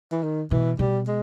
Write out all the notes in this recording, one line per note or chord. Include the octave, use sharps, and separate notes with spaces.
E3
D#3
B2 E3
B2 G3
G#3